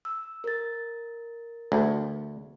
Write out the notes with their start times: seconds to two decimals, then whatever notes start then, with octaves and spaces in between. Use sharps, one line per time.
0.05 E6
0.44 A#4 A6
1.72 D2